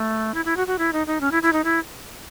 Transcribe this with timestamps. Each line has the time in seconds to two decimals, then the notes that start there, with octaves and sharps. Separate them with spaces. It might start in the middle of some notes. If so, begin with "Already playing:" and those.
Already playing: A3
0.34 E4
0.45 E4
0.57 F#4
0.67 F#4
0.79 E4
0.93 D#4
1.07 D#4
1.21 C#4
1.32 E4
1.43 E4
1.53 D#4
1.64 E4